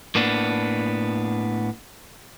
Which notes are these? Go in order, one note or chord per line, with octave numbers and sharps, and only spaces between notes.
A2 A#3 B3 D4